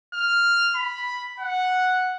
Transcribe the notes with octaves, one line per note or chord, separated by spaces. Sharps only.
F6
B5
F#5